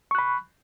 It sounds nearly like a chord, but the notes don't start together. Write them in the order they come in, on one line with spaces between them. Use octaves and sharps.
C#6 F#6 B5